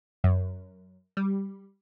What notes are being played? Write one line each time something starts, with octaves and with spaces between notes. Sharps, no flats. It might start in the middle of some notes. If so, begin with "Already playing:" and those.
F#2
G3